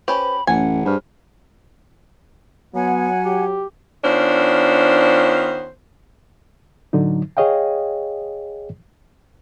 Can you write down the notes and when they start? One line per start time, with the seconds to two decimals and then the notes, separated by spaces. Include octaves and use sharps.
0.08 C#4 G4 B4 C5 B5
0.47 A1 F#2 A3 C#4 F#5 G#5
0.85 G2 G#4 C5 F6
2.75 F#3 B3 C#5 F#5 G#5
3.26 G4
4.04 D#3 B3 C#4 D4 F4 C5
6.93 A2 D3 F#3 D#4
7.37 G#4 C#5 D#5 F5 G5